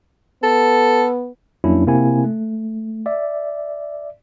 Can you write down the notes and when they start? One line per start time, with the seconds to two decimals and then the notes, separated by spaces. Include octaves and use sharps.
0.43 B3 A4
1.64 F2 F#3 A#3 C#4 D4 E4
1.87 C3 A#3 C4 E4 G#5
2.24 A3
3.06 D5 E5